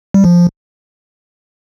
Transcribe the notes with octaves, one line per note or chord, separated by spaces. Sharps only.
G3
F3